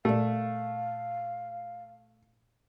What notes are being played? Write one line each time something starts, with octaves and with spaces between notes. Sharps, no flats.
A#2 A3 D5 F5